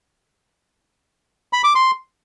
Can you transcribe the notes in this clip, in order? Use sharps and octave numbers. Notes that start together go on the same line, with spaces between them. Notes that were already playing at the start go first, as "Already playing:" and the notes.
B5
D6
C6